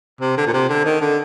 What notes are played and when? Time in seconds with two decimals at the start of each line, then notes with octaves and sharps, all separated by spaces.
0.21 C3
0.37 D3
0.46 A#2
0.53 C3
0.69 D3
0.85 D#3
1.01 D3